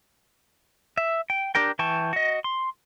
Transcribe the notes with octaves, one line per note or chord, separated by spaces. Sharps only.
E5
G5
D4 G4 A#4 G5
E3 G5 A5 C#6
F#4 D#5
C6